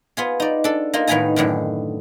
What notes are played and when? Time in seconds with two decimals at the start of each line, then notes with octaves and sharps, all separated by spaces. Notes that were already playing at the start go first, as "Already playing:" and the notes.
0.17 B3 F4 G#4
0.40 D#4 D5
0.64 D4 A4
0.94 A#3 D#4 F4
1.07 A2 D#3 B3 D#4 G#5 A#5
1.36 F#2 A2 D3 D#3